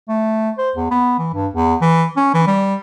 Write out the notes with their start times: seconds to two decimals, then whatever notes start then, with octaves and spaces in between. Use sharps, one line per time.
0.09 A3
0.58 C5
0.76 E2
0.91 B3
1.19 E3
1.34 G2
1.54 E2
1.81 E3
2.17 C#4
2.34 E3
2.47 G3